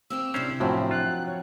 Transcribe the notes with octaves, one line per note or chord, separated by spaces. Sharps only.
A#3 C4 G4 E6
C3 C#4 D4 E4 C5 A#5
F#2 A2 F3 F#3 C4 E5
F4 F#6
C#5